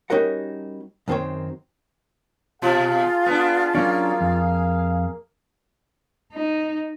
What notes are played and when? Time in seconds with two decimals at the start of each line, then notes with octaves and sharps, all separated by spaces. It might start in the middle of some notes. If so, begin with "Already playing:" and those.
0.10 G3 C#4 D#4 F#4 A#4 F#5
1.08 F#2 D#3 C4 A4 C5 C#5
2.62 B2 F4 G#4 F5
3.26 B3 D4
3.75 F#3 A#3 C#4 D4
4.21 F2
6.33 D#4